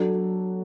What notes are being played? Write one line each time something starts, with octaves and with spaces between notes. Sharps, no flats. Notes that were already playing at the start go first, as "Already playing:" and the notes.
Already playing: F#3 D4 F#4 A4